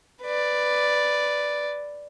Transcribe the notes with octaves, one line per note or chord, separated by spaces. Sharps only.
B4 D5